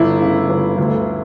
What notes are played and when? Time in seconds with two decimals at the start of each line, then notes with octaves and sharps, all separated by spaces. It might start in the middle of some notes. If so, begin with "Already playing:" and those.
Already playing: G1 E4
0.22 C#3
0.49 G1
0.78 D2